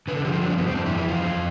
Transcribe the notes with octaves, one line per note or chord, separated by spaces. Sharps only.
D3 B4
A4
F3 G4
F4
G2 D4
C4
G2 B3
C4
F2 D4
E4
E3
E4
F2 F4
F2